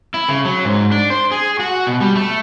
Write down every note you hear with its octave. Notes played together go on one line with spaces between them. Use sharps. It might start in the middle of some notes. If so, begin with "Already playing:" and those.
E4
C#3
F#3
G#2
D4
C5
G#4
F#4
B2
G3
A3